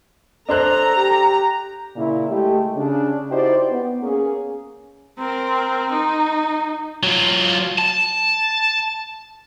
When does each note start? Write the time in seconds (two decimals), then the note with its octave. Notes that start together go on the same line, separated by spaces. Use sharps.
0.49 D4 A4 C5 A#5 F#6
0.97 G4
1.96 A#2 C#3 E4
2.29 G#3 A3 G4
2.76 C#3 D4
3.30 D#4 E4 F#4 G4 C5 D5
3.70 B3
4.02 A#3 C#4 G#4
5.18 C4 A#4
5.91 D#4
7.03 F#3 F4
7.78 A5